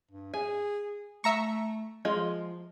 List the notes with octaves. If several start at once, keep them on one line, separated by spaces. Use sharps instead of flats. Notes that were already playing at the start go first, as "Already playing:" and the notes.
G2
G#4 G#5
A3 E5 A#5 C#6
F3 G#3 F4 D#5